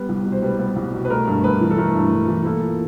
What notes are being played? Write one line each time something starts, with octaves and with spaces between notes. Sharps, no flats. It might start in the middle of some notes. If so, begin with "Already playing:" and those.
Already playing: G3 B3 B4
C2
B2
C5
G3 B4
B3
C2
B2
B4
A3 A#4
G2
G2 B4
E3
A4
A3 A#4
G2
G2
E3
A#3 A4
A#2